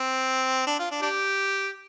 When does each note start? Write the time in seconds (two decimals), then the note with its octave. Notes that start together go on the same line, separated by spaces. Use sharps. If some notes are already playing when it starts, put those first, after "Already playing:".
Already playing: C4
0.67 D4
0.79 F4
0.91 D4
1.02 D4 G4